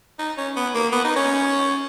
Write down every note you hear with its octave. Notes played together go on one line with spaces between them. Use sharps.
D#4
C#4
B3
A#3
B3
D#4
C#4